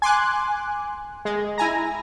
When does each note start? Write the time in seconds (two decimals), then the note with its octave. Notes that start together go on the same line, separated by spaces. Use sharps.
0.02 G#5 C6 D6 F#6
1.25 G#3
1.58 E4 G#5 A#5